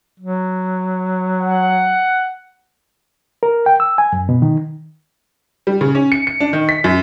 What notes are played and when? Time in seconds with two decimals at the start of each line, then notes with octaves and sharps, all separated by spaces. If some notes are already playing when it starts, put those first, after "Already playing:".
0.20 F#3
1.41 F#5
3.43 A#4
3.66 G5
3.80 E6
3.98 G#5
4.13 F#2
4.29 B2
4.42 D#3
5.67 G3
5.81 C#3
5.95 C#4
6.12 C#7
6.27 C#7
6.40 D4
6.53 D#3
6.69 B6
6.84 F#2